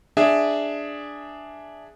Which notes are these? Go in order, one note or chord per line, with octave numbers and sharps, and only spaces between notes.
D4 G#4 E5